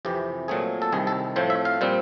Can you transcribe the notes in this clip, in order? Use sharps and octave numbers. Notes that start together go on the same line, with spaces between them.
F2 C3 E3 G4
A#2 F#3 A3 C4 G#4
A4
C2 C3 D#3 G#4
A4
A2 F3 A3 C4 C5
E5
F5
A#2 G3 C4